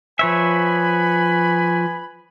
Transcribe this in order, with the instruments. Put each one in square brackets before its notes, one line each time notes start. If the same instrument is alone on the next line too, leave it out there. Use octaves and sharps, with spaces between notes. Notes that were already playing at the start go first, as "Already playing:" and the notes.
[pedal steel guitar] F3 C#5 E5 [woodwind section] B4 G#5 B5